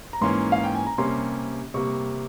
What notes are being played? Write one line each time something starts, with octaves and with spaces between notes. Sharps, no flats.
A#5
G#2 E3 A#3 C#4 C6
F5
G5
G#5
A#5
C3 G3 A#3 C#4 C6
C3 G3 A#3 C#6